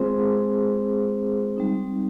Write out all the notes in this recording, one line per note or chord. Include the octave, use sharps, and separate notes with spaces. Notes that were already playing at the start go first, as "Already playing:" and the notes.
Already playing: G#3 C4 F4 G#4 C5
G3 C4 D#4